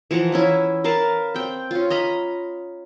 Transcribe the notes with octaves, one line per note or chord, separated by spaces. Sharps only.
E3 F3 F#5 A#5
E3 C#4 E4
A#4 B4 F5 A5
C4 G5
C#4 F4
D#5 A#5 B5